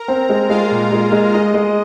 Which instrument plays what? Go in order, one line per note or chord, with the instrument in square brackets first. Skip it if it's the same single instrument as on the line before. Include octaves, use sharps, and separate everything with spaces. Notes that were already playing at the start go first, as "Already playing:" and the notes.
Already playing: [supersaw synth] A#4 A#5
[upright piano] C4
G#3
[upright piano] G#3 [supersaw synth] F4 F5
[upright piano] A#2
G#3
G#3
[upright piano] G#3 [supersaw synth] D#5
[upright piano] G#3